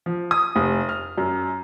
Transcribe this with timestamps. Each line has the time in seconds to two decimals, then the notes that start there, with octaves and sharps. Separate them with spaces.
0.06 F3
0.31 D#6
0.56 F1
0.89 F6
1.18 F#2